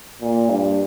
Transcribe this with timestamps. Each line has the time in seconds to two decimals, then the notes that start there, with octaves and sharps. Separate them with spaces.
0.21 A#2
0.50 G2